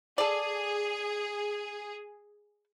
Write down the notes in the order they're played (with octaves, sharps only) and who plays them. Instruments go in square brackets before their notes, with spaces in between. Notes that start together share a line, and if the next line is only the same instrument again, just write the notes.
[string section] G#4 [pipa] A4 D5